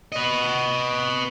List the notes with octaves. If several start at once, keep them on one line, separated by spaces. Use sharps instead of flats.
B4 D#5